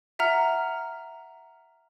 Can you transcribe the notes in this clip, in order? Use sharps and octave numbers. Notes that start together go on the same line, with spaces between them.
E5 F#5 A#5 F6